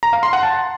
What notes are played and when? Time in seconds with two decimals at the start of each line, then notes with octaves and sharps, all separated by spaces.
0.03 A#5
0.13 F5
0.23 C6
0.33 F#5
0.43 A5